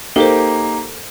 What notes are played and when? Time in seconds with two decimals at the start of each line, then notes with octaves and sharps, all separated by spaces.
0.16 A#3 D#4 G4 A4 A#4 C5